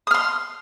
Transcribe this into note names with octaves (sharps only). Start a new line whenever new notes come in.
C6 D#6 F6